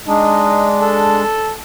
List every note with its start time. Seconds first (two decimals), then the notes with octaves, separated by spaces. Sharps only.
0.08 G#3 D4 D#4
0.82 A4